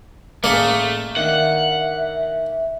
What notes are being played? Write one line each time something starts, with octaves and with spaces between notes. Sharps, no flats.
A1 A3 A#3 G#4 D5
D#3 D4 E5 F#5